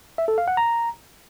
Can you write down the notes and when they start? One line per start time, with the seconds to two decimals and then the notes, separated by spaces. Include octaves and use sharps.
0.18 E5
0.28 A4
0.38 F5
0.48 F#5
0.57 A#5